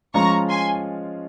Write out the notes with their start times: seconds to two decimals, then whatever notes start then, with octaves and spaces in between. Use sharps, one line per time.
0.14 F3 G#3 C#4 F4 A#5 C#6
0.49 G#5 C6